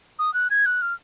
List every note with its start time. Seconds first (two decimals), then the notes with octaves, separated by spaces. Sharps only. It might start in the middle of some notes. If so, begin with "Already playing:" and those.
0.19 D#6
0.34 F#6
0.50 G#6
0.66 F#6
0.82 F6